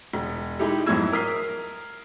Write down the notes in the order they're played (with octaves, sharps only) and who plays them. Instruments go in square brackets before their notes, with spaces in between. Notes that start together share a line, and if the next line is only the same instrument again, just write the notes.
[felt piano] E1
G#3 D#4 E4 G4 A4
F2 G#2 F#3 E4 E6 G#6
A#4 D#6 B6 C7